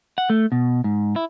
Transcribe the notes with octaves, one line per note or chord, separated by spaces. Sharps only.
F#5
A3
B2
G#2
E4